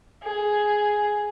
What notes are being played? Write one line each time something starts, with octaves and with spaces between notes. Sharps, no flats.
G#4